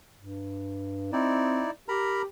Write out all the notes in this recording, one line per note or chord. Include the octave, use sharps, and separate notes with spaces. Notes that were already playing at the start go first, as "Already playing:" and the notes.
G2
C4 D#4 E4 D5
G4 A#4 A#5 B5